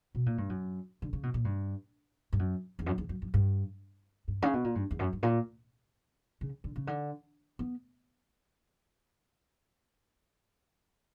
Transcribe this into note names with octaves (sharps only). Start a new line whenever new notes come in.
B2
A#2
G2
F#2
D3
C#3
B2
A#2
G2
G2
F#2
E2
F#2
E2
F#2
F#2
G2
G2
C#3
B2
A#2
G2
E2
F#2
G2
A#2
C#3
D3
C#3
D3
B3